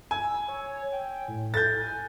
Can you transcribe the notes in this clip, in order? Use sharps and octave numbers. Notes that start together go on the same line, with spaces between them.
G#5 E6
C#5
G5
A2
A4 G6 A6
G#5